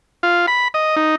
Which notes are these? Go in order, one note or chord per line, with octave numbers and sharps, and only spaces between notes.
F4
B5
D#5
D#4